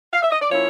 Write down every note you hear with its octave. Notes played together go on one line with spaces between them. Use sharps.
F5
E5
D#5
D5
F3 A#3 C#4 E4 C#5